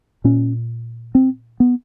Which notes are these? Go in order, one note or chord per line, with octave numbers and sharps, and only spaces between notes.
A#2 C#4
C4
B3